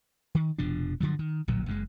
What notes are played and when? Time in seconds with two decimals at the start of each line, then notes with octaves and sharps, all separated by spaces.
0.35 D#3
0.59 F1 B2 F3 D4
1.01 G2 D3 F3 F#3
1.19 D#3
1.48 D1 A#1 A#2 F#3
1.66 F#1 F#2 D3 G#3